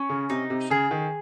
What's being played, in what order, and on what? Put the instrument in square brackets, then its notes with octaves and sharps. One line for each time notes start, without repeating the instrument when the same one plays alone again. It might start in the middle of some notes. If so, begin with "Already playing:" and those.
Already playing: [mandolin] C#4
[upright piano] C#3
[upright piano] C3 [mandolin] D#4
[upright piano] C3
[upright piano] C#3 [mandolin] G#4
[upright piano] D#3